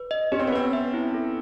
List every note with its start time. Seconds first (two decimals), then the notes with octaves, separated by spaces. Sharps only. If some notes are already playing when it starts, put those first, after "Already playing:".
Already playing: B4
0.11 D#5
0.32 C#4 G4
0.39 C4
0.47 B3
0.52 C4 B4
0.73 E5
0.94 E4
1.14 A4